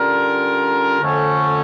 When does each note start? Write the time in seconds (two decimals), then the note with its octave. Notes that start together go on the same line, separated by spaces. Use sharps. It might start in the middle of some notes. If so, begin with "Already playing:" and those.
Already playing: D3 G3 C#4 F4 A#4
1.01 F2 D3 A3 C#4